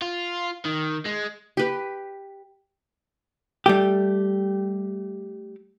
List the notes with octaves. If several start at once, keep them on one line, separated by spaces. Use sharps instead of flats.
F4
D#3
G#3
G4 B4
G3 A3 G4